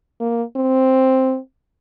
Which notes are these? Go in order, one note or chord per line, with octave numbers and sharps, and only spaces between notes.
A#3
C4